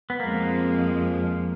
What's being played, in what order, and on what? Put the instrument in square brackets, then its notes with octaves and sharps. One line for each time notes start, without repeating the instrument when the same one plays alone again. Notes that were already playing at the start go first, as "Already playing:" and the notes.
[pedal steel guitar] B3
[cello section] F2 F3 G#3 [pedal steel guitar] A#3